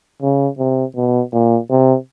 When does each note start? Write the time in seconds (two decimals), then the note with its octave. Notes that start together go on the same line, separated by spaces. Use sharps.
0.22 C#3
0.59 C3
0.96 B2
1.33 A#2
1.70 C3